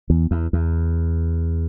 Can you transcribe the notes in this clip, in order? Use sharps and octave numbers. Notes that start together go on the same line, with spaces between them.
E2
E2
E2